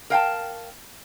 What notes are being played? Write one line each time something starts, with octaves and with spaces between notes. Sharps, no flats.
A#4 F5 G5 A5